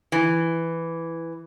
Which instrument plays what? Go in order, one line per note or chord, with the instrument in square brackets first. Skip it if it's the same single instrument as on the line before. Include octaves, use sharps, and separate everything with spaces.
[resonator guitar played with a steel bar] E3